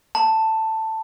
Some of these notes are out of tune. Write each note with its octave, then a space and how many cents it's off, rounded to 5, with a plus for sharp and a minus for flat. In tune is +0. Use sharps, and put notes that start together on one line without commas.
A5 +10